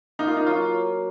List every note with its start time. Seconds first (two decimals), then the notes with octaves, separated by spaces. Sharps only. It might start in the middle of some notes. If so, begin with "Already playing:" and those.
0.19 A#3 D#4
0.28 F4
0.37 D#4
0.47 F#3 F4